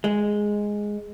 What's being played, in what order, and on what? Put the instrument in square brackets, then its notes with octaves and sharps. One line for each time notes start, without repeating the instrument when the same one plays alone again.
[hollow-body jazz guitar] G#3